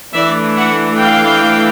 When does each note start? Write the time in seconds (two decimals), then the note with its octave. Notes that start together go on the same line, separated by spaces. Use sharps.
0.14 E3 A3 D4 D5 E5
0.57 E5 F#5
0.99 F5 G5